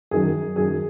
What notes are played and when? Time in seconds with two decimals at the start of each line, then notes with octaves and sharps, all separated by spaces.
0.11 F#2 D#3 F#3 G#4
0.56 F#2 D#3 F#3 G#4